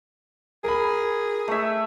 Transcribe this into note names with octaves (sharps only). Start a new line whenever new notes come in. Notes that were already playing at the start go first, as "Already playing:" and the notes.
G#4 A#4 B5
A3 E5